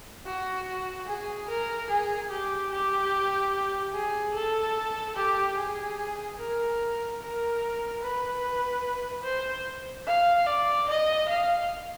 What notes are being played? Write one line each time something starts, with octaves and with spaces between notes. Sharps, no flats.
F#4
G#4
A#4
G#4
G4
G4
G#4
A4
G4
G#4
A#4
A#4
B4
C5
F5
D5
D#5
F5